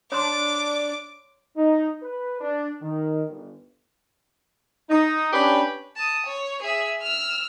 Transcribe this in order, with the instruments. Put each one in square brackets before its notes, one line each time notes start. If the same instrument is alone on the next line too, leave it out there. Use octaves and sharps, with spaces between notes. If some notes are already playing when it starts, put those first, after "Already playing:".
[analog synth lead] D4 [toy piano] C#5 A#5 C6 [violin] D6
[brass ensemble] D#4
B4
D4
D#3
G1
[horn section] D#4
C#4 D4 G4 B4 B5
[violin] A5 D#6
C#5
G#4 E5
E6 F6